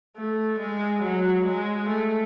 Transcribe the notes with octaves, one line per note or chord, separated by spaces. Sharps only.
A3
G#3
F#3
G#3
A3